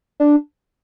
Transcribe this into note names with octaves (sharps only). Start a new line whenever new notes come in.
D4